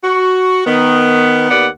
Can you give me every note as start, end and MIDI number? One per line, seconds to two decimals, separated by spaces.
0.04 0.65 66
0.66 1.46 51
0.66 1.46 59
1.50 1.67 39
1.50 1.67 59
1.50 1.67 74
1.50 1.67 78